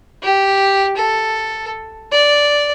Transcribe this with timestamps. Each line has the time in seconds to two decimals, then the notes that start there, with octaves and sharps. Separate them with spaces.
0.23 G4
0.96 A4
2.12 D5